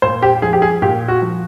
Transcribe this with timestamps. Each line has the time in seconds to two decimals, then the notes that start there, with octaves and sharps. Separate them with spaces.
0.02 A#2 C5
0.22 G4
0.42 F3 G#4
0.53 G4
0.62 G#4
0.82 A#2 G4
1.08 F#4
1.22 F3